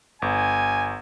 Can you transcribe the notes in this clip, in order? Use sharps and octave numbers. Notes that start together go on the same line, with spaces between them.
G1 G#5